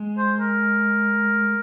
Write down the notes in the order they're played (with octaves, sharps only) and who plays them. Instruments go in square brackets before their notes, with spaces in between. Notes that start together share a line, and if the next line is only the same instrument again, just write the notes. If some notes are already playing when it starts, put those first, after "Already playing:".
Already playing: [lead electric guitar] G#3
[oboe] C5
A#4